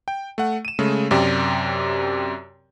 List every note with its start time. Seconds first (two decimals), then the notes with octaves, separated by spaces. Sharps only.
0.08 G5
0.38 A3 F#5
0.65 D#7 E7
0.79 C#3 G#3 A3
1.11 F#2 C3 G4 D5